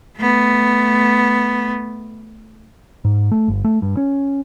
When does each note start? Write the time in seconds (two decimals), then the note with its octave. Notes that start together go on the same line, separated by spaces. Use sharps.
0.17 A3 B3
3.05 G#2
3.32 A3
3.48 G1
3.64 A3
3.82 G2
3.97 C#4